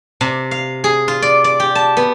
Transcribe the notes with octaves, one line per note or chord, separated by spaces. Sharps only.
C3
F5
G#4
F4
D5
D5
G4
A5
B3